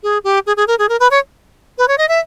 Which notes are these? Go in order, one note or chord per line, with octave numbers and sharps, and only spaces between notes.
G#4
G4
G#4
G#4
A#4
G#4
A#4
B4
C#5
B4
C#5
D#5
E5